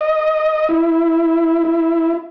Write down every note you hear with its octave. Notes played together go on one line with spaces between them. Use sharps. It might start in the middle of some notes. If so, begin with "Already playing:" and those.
D#5
E4
E4